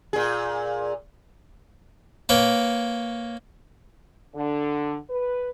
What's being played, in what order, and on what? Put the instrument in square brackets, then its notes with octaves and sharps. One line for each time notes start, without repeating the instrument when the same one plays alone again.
[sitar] A#2 G#4
[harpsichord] A#3 B4 C#5 G5
[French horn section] D3
B4